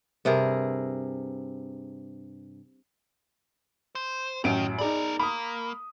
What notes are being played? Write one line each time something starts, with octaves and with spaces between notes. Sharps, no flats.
G2 C3 G#4 A#4
C5
A1 F#2 D#3 D7
B3 D#4 G#4 A#4 D5
A#3 B5 D#6